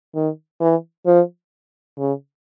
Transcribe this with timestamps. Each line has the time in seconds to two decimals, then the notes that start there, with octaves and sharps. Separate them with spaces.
0.15 D#3
0.61 E3
1.06 F3
1.98 C#3